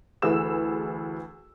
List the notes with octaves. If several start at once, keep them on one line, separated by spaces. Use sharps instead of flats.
D2 E3 G#4 B4 E6 E7